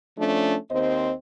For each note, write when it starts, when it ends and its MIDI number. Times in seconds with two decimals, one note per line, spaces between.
0.18 0.55 53
0.18 0.55 57
0.18 0.55 61
0.18 0.55 62
0.70 1.12 39
0.70 1.12 60
0.70 1.12 72
0.70 1.12 75